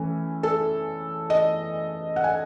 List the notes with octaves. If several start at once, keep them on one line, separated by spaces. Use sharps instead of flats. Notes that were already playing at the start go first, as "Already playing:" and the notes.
Already playing: E3 A3 C#4
A4
D#5
F#5
G#5